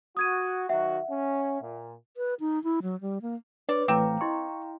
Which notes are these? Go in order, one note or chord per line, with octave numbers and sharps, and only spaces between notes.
F#4 D#6 G#6 D#7
D#3 F#3 F#4 E5 F#5
C#4
A#2
B4
D#4
E4
F#3
G3
A#3
D4 B4 C#5 D5
A2 E3 A3 C4 F5 G5 A#5 D6
E4 D#5 C6 C#6